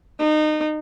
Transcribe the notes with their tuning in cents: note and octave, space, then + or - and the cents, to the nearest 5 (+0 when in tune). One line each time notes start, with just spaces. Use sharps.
D#4 -25